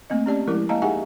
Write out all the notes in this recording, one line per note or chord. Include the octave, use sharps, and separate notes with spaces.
A3 A#3 C4 D#5
C#4 G4 D5 A5
F3 G#3 E4 A#4
A#3 D#5 F5 A5 A#5
D#4 G4 G#4 E5 F#5 G#5